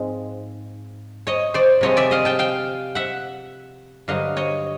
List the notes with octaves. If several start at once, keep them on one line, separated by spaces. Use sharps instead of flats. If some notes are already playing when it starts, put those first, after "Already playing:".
Already playing: G#2 F3 G#3 C4
C#5 D#5
C5 D5
C3 F3 G#3 C4 C#5 D#5
D5 E5
D#5 F5
G5 A5
F5 G5
E5 F#5
G2 D3 F#3 D#5 F5
C#5 D#5